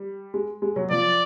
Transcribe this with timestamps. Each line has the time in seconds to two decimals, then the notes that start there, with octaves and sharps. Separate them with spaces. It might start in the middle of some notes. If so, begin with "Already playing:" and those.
Already playing: G3
0.34 G#3
0.62 G#3
0.76 F#3
0.90 F3 D5